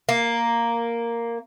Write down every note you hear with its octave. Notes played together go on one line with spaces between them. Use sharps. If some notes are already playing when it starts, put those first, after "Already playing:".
A#3